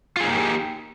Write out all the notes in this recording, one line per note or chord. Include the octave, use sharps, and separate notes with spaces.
A#3 D#4 F4 G4 G#4